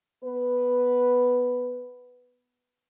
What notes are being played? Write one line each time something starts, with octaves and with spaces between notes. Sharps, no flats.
B3 B4